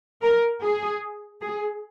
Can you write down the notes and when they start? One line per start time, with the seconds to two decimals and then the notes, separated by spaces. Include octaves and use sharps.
0.22 A#4
0.63 G#4
1.41 G#4